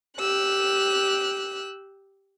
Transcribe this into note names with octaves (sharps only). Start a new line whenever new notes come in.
G4 E6 F#6